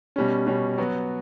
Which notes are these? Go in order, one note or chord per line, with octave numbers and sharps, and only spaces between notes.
B2 G3 C#4
B2 G3 C#4
F#3 B3 F#4